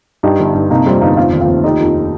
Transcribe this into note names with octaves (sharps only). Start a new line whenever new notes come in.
G2 D#4 G4
G1
G2
C3 A#3 D#4
F2 G3 C4
G1 A#3 D#4
F1 C4 F4
D#2
C4 F4
D#2
F2 D#4 G4
F2